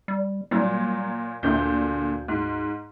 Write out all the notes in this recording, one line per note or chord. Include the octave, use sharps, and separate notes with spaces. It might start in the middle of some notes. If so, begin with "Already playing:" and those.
G3
A#2 F#3 G3
D2 A#2 D3 G6
G#2